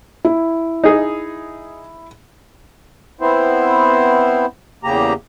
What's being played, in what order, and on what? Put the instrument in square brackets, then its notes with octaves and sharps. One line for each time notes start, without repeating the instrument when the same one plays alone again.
[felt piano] E4
[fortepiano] D#4 G#4
[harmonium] B3 C4 E4 C5
E2 C#3 A#3 G4 A#5